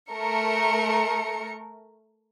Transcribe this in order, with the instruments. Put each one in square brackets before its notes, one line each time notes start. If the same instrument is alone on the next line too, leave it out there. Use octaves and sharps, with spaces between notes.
[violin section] A3 A#4 C#7